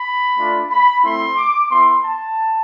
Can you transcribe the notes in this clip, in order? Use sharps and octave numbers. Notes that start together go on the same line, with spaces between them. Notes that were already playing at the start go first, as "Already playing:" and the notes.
Already playing: B5
A3 D4 F4
B5
A3 C4 E4 C6
D6
B3 E4 C6
A5